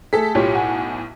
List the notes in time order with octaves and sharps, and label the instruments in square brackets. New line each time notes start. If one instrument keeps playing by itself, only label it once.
[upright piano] A3 G#4 [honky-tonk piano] A4 B6
[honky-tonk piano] B1 A2 [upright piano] F4 G4 C#5
[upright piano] F#5 G#5